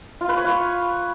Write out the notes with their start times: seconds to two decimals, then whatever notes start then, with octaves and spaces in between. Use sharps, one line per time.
0.21 F4
0.29 B4
0.37 C#5
0.45 F4